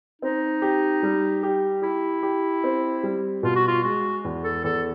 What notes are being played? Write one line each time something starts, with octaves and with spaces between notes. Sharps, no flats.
C4 D#4
G4
G3
G4
E4 G4
G4
C4
G3
B2 F4
F#4
F4
G#3 F#4
E2
A4
E2 A4